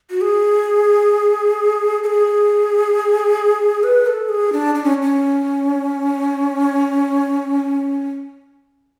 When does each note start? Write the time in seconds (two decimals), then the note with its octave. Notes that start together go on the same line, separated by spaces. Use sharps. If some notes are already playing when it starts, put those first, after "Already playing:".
0.10 F#4
0.21 G#4
2.03 A4
2.06 G#4
3.83 B4
4.07 A4
4.29 G#4
4.52 D4
4.75 D4
4.84 C#4
5.03 C#4